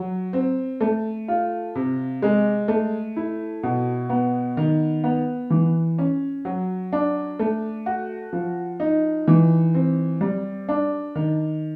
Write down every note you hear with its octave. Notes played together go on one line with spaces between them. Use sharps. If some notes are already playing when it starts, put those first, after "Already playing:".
Already playing: F#3
C4
A3
F4
C3
G#3
A3
E4
B2
B3
D#3
B3
E3
C#4
F#3
D4
A3
F#4
F3
D#4
E3
C4
G3
D4
D#3